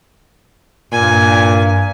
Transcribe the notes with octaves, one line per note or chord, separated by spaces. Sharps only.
G2 A#2 G#5